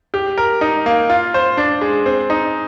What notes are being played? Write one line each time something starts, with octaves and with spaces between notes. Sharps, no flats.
G4
A#4
D#4
A#3
F4
C5
D4
G#3
C4
D#4